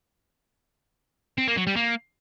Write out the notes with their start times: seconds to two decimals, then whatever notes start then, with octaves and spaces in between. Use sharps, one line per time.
1.38 C4
1.47 A#3
1.57 F#3
1.67 G3
1.76 A#3